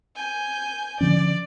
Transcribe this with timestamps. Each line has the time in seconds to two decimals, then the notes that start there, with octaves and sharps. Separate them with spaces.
0.16 G#5 G6
1.01 D3 F3 C#4 D5